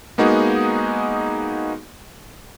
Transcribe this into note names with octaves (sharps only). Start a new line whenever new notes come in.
G#3 A#3 B3 D#4 F#4 G#4